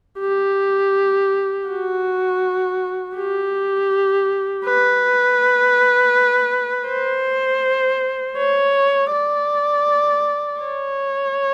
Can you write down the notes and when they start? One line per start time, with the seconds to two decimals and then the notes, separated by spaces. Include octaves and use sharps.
0.19 G4
1.68 F#4
3.17 G4
4.65 B4
6.89 C5
8.38 C#5
9.12 D5
10.61 C#5